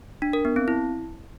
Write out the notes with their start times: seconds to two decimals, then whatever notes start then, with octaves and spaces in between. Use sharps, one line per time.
0.22 D4
0.33 A#4
0.45 B3
0.56 C4
0.68 E4